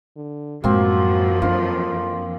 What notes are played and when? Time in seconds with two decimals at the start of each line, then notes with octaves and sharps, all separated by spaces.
0.17 D3
0.64 F#2 A2 F3 G#3 A#3 C4 F#4
1.42 F2 D4 F4